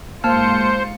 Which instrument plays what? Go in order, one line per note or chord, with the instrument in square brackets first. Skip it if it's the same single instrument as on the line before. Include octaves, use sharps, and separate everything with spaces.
[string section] G#2 F4 C#7 [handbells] A#3 A5 F6 [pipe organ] C5